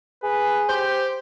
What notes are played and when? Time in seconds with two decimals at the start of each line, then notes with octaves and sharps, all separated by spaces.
0.23 G#4 B4
0.69 G4 C5